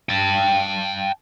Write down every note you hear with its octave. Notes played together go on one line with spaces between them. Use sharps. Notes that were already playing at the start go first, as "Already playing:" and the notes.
G5 A5